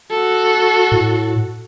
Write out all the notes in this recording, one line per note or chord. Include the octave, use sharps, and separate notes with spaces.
F#4 A4
A2